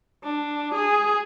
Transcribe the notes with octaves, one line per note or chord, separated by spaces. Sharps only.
D4
G#4